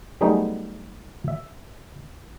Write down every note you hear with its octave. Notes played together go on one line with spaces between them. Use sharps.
F#3 G3 A3 B3 D#4 G#4
E5